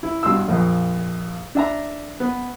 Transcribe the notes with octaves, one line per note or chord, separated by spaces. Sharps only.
E4
G2 B2 C6 E6
A#1 F2
D4 E5 A#5
B3